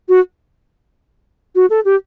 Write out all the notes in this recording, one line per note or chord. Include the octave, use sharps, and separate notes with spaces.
F#4
F#4
A4
G4